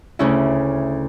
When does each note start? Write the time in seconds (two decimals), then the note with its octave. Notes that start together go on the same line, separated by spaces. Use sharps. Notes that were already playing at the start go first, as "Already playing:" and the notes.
0.19 D2 C#3 C#4 E4